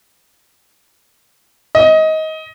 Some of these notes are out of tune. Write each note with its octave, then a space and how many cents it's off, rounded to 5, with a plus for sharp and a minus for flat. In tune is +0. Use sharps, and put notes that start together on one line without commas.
D#5 +20